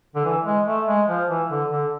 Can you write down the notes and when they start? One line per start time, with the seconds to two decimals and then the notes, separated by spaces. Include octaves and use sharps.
0.15 D3
0.25 E3
0.45 G#3
0.66 A3
0.87 G#3
1.08 F3
1.28 E3
1.49 D3
1.70 D3